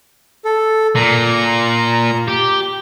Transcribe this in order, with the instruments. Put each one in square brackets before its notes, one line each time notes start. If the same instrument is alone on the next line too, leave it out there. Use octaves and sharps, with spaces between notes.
[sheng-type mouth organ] A4
[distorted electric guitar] A#2 [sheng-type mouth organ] A#5
[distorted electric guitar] G4